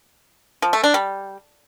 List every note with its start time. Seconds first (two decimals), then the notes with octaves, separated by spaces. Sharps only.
0.62 F3
0.73 A3
0.84 D4
0.94 G3